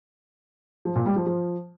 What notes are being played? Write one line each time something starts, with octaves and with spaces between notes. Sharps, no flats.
F3
A#2
G3
F3
F3